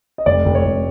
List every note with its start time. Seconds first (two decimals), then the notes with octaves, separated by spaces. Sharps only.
0.18 D#5
0.26 F1 D5
0.45 F1
0.55 C#5
0.64 F1